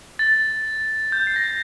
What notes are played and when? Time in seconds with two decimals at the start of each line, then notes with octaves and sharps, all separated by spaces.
0.19 A6
1.12 G6
1.27 C7
1.36 A#6